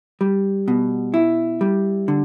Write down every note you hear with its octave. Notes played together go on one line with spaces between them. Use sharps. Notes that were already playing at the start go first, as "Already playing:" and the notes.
G3
B2
E4
G3
D3